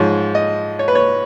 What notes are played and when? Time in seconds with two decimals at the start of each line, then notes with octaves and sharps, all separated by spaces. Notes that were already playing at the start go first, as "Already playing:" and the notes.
Already playing: G#2 F3 C#5
0.35 D#5
0.79 C#5
0.88 B4
0.95 C#5